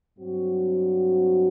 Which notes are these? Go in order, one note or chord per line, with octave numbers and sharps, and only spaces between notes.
G2 F#3 C4 F#4